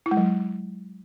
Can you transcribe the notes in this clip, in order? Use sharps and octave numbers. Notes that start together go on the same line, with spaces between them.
E4
G#3
F#3